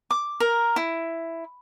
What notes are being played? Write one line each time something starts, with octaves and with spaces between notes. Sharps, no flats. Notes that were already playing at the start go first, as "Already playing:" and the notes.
D6
A#4
E4